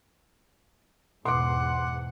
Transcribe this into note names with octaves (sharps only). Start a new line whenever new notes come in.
E2 G#2 B2 F#5 C6 D6